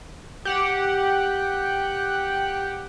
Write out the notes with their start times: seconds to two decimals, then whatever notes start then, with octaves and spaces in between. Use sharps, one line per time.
0.45 G4 F#5